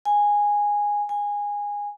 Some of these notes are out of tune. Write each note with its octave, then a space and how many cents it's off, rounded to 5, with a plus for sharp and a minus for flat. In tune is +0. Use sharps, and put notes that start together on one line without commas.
G#5 -10
G#5 -15